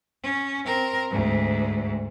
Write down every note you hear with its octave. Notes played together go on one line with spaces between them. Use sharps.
C#4
C4 A#4
D2 G#2